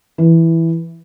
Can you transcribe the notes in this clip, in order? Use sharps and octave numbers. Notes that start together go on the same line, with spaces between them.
E3